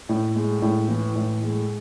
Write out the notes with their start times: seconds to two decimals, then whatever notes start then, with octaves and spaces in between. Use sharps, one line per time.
0.09 A2
0.36 G#3
0.62 A2
0.89 E3
1.16 A2
1.43 G#3